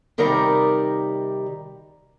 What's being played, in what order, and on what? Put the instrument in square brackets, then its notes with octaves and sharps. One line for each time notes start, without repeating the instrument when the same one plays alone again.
[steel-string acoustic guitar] C3 D#3 G3 A#4 D5 A#5